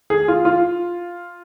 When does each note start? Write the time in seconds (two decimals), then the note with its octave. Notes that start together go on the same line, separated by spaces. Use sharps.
0.10 G#4
0.28 F4
0.45 F4